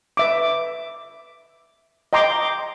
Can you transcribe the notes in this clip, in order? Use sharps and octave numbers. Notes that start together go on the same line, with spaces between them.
B4 E5 D6
D#5 G5 A#5 C6 D6